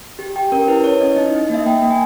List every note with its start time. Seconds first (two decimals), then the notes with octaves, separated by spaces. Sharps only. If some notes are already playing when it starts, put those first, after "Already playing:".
0.19 G4
0.36 G4 G5
0.52 C#4 A#4
0.68 E4 B4
0.84 E4 C#5
1.01 C#4 D#5
1.17 D#4 D#5
1.34 D#4
1.42 D#5
1.50 A#3 E5
1.66 A#3 G5
1.82 A#3
1.91 G#5